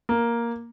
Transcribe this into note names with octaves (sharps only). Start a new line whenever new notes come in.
A#3